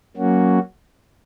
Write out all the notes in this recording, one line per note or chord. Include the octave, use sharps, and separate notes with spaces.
F#3 A#3 C#4 F#4